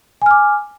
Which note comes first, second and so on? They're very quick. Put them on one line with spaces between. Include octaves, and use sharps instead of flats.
G#5 F6 D6